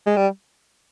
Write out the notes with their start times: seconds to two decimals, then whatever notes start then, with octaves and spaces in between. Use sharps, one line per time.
0.06 G#3
0.17 G3